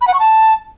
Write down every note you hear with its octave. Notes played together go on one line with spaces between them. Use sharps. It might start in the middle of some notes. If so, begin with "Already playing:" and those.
B5
F#5
C#6
A5